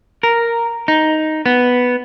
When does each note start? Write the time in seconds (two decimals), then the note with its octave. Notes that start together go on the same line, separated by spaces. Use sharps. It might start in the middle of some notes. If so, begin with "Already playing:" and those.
0.23 A#4
0.88 D#4
1.46 B3